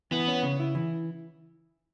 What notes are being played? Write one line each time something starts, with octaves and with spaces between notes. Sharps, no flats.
E3 B3
C#4
C#3
E4
E3